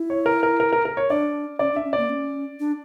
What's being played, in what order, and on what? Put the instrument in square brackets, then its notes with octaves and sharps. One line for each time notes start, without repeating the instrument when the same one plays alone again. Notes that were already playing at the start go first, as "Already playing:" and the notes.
Already playing: [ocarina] E4
[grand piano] C#5
A#4
A#4
A#4
A#4
A#4
C#5
[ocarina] D4 [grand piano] D5
[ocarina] C#4 [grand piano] D5
[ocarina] D4
[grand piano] E5
[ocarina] C#4
[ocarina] A#3 [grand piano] D5
[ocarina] C#4
D4